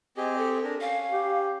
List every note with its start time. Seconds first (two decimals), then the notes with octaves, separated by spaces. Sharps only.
0.17 C4 G4 G#4 D#5
0.38 A4
0.64 D4 A#4
0.81 C#4 F5
1.12 G4